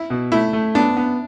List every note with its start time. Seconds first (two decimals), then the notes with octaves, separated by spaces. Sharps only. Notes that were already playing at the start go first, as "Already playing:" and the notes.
Already playing: E4
0.10 B2
0.32 A3 E4
0.53 A3
0.75 B3 D4
0.97 B3